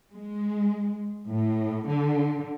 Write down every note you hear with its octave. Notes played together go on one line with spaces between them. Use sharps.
G#3
A2
D3